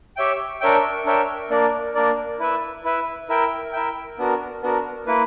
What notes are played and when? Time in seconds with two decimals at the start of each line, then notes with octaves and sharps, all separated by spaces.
0.17 G4 C#5 E5 G5
0.61 D4 A#4 C#5 E5 G5
1.05 D4 A#4 C#5 E5 G5
1.50 A#3 D4 A#4 D5
1.95 A#3 D4 A#4 D5
2.39 E4 B4 E5
2.84 E4 B4 E5
3.29 E4 A#4 E5 G5
3.73 E4 A#4 E5 G5
4.18 B3 D4 F#4 A#4
4.63 B3 D4 F#4 A#4
5.07 A#3 E4 B4